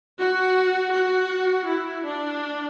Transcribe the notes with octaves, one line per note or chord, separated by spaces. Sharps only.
F#4
F#4
E4
D4